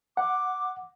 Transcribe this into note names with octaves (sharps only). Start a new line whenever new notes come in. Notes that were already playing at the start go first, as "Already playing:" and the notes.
F#5 D6